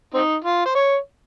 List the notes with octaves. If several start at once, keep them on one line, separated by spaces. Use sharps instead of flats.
C4 D#4
F4
C5
C#5